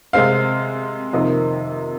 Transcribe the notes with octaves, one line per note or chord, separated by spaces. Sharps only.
C3 G#3 C4 F5
F2 C3 D#3 A#3 D#5